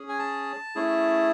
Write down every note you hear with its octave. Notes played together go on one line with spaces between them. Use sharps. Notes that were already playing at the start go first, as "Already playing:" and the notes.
Already playing: C#4 G#4
G#5
A5
A3 C#4 E4 G#4